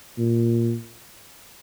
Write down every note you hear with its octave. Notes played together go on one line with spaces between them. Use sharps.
A#2